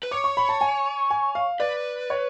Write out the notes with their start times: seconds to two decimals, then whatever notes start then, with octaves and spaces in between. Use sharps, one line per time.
0.03 B4
0.11 C#5 D6
0.24 C#6
0.37 B5
0.49 A5
0.61 G#5
1.10 G#5
1.35 F5
1.60 B4 D5
2.10 C#5